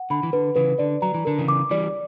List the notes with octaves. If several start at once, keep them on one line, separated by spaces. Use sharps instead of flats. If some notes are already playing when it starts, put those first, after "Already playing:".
Already playing: F#5
D3 B5
E3
D3 B4
C#3 E3 B4
D3 D5
F#3 A#5
E3
D3 A#4
C#3 E3
D6
E3 G3 D5